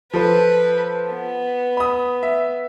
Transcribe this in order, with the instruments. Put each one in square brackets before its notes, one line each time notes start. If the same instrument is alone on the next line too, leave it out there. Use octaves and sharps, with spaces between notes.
[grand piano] F3 A4 C5 [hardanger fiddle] B4
[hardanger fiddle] B3
[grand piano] B5 D#6
E5